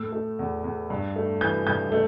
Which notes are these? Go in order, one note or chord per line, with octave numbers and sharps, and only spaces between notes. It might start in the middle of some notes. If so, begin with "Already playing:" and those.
Already playing: A2 A3 E6
A3
E2
E2
G2
A3
E3 G6
G2 G6
A3